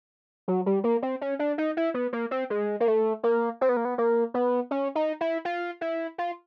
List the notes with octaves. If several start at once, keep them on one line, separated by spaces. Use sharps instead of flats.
F#3
G3
A#3
C4
C#4
D4
D#4
E4
B3
A#3
C4
G#3
A#3
A3
A#3
C4
B3
A#3
B3
A#3
B3
C#4
D#4
E4
F4
E4
F4